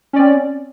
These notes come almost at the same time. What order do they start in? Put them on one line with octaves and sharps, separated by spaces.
C#4 D5 C4